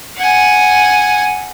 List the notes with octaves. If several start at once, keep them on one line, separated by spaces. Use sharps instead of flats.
F#5 G#5